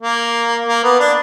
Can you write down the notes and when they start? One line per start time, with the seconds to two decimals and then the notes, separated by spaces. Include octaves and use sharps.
0.01 A#3
0.66 A#3
0.84 B3
1.00 D4